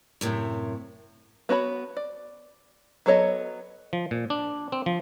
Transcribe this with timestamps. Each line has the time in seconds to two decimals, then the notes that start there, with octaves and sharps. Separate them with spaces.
0.21 F#2 A2 C3
1.49 B3 F#4 C#5 B5
1.97 D5
3.06 F#3 B3 A4 C#5 D#5
3.93 F3
4.11 A#2
4.30 D4
4.72 C4
4.86 F3